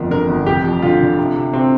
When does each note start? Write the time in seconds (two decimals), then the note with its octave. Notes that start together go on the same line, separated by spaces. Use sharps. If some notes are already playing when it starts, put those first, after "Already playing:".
Already playing: G1 F2 A#4
0.11 D3 A#4
0.29 G1
0.46 F1 G4
0.64 F2
0.82 D3 F4
1.01 D3
1.18 C3
1.36 C3
1.53 C3 C4